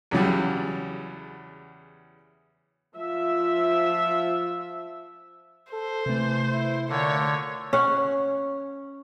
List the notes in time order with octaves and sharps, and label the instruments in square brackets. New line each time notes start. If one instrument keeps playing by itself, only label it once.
[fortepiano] E2 C#3 F#3 G3
[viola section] F3 E5
[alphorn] A4 [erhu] C5
[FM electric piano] C3 A3 [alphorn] E3
[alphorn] E4
[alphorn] A#2 [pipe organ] D3 [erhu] C#5
[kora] C#4 F#5